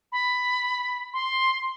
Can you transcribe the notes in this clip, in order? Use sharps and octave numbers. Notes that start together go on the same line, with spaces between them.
B5
C6